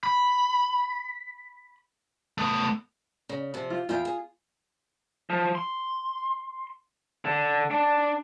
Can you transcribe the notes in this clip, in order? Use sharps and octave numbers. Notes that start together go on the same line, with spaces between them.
B5
A3 B3
C#3
C3 F3
F4
E2 E4 F4 G5
G#4
F3
C6
D3
D4